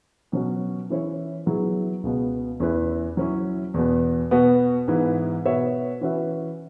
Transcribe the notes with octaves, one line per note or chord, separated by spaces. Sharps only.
B2 F#3 C#4 F#4
E3 C#4 E4 C#5
F#3 B3 E4 G#4
C#2 B2 B3
E2 E3 C#4 E4 B4
F#3 C#4 E4
E2 B2 B3
B2 B3 F#4 B4
G#2 E3 B3
B2 B3 F#4 C#5 E5
E3 C#4 F#4 B4 E5